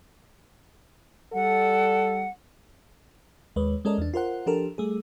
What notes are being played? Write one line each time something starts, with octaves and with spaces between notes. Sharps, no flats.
G3 A4 F#5
D#2 G#3 B4 C#5
G#3 C#4 A4 A#4 D5 D#5
E2 D4
F4 A#4 C5 F#5
F3 D4 G4 A4 A#4
G3 A3 G#4